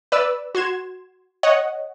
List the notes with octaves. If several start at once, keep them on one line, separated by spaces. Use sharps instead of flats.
B4 D5 E6
F#4 C6 G#6 E7
C#5 D#5 F#5